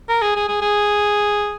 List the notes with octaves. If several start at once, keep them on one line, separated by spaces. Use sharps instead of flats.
A#4
G#4
G#4
G#4
G#4